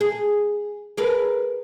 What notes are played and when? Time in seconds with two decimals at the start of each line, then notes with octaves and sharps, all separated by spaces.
0.01 G#4
0.97 G#4 A#4 B4